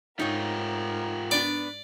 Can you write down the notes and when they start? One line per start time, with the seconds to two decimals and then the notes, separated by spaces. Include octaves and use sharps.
0.19 G#2 D#4 F4 G4 A#4 C#5
1.31 B3 D4 D5